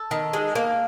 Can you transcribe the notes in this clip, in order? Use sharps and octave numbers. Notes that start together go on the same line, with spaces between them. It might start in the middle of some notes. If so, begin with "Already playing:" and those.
Already playing: A4
D#3
G#3
A#3